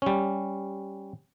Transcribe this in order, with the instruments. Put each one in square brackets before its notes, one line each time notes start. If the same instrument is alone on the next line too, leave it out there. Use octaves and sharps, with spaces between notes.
[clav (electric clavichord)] G3 C#4